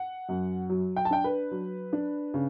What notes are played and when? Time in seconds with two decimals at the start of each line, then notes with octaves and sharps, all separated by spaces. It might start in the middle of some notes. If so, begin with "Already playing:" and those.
Already playing: F#5
0.29 F#2
0.70 F#3
0.96 G5
1.05 A5
1.10 D4 G5
1.24 B4
1.51 F#3
1.93 D4
2.34 C#3